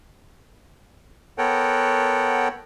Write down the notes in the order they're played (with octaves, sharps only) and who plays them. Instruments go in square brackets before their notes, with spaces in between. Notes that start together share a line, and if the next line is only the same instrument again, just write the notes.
[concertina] B3 A4 A#4 C#5 F#5 G5